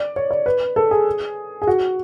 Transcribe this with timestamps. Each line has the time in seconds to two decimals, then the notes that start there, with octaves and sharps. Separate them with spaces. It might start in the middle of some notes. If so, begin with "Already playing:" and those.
Already playing: D5
0.16 C#5
0.31 D5
0.46 B4
0.76 A4
0.91 G#4
1.62 G#4
1.67 F#4